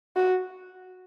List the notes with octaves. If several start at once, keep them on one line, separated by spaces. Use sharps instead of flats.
F#4